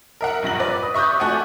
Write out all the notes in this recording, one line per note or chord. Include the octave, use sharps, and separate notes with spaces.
A#4 E5 F#5
A#1 G2 A#6 F#7
B4 D5
D#6
E5 C#6 D#6 F#6 G6
A3 F#4 D5 F#5 G#5